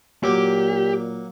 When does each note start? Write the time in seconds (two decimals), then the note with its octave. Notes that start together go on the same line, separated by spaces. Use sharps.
0.24 A#2 F#3 A#3 G4